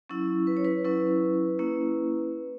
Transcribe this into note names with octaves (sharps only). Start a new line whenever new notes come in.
F#3 C#4 E4
B4
C#5
B4
F#3 C#4 E4 B4
A#3 C#4 E4